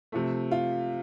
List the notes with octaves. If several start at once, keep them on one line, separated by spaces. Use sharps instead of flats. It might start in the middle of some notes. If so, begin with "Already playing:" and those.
C3 F3 A3
F4